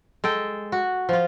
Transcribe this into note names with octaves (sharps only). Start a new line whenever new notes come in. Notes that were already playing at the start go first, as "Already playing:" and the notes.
G#3 A4 G5
F#4
F3 F4